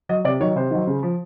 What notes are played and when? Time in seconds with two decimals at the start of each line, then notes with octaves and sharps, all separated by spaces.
0.09 F#3 D#5
0.24 C3 D5
0.40 D#3 F#3 C#5
0.56 C3 C5
0.71 D#3 F#3
0.87 C#3
1.03 F3